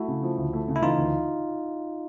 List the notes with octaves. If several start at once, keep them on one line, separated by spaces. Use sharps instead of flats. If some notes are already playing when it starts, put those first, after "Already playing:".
Already playing: A3 E4 F#4
C#3
F3
D2
A3
C#3
E4
E3 D#4 F4
D2